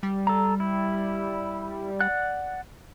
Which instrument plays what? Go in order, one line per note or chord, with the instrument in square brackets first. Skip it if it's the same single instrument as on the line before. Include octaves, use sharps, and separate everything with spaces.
[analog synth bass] G3
[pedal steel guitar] A4 A#5
E4
D5 F#5 F#6